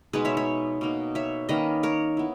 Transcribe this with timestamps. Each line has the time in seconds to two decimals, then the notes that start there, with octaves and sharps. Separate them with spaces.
0.13 B2 G#3 D#4 G#4 B4
0.25 C#5 E5
0.37 C#5 E5
0.81 B2 A#3 D#4
1.15 C#5 E5
1.49 D#3 A#3 C#4 B4 D#5
1.83 A#4 C#5
2.17 B3 E4